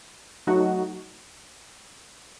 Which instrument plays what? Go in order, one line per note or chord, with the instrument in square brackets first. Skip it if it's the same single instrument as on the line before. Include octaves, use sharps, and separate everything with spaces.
[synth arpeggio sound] F#3 A3 D#4 F#4